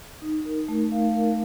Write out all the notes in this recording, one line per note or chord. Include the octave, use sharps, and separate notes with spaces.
D#4
A#4
A3
F5
A#4